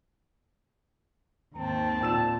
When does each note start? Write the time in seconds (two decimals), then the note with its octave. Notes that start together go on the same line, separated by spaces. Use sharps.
1.56 D#2 G#2 C4 A5
2.01 A#2 E6 E7